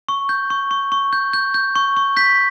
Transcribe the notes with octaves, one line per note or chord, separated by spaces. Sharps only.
C#6
G6
C#6
C#6
C#6
G6
G6
G6
C#6
C#6
G6 B6